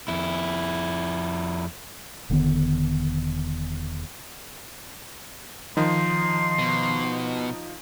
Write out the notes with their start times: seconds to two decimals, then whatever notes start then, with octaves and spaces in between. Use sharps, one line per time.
0.08 F2 E4
2.30 E1 D3 D#3 B3
5.77 D#3 F3 D#4 C6
6.59 B2